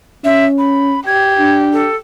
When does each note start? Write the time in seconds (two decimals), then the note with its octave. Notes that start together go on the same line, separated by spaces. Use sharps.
0.25 C#4 E5
0.59 B5
1.07 G4 G#6
1.38 D4
1.73 A4